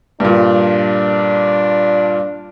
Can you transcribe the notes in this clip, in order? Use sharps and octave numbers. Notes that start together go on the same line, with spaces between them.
G2 A#2 D4